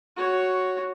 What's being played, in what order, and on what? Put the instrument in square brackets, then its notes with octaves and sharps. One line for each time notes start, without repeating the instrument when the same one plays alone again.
[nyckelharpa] F#4 C#5